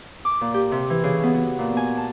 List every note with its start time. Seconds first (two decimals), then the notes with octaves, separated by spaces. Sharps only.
0.25 D6
0.41 A#2
0.54 G4
0.72 C3
0.90 E3
1.03 C#3
1.23 B3
1.34 F#4
1.59 A#2
1.77 G#5
1.98 A5